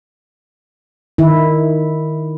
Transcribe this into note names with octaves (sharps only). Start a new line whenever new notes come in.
D#3 E4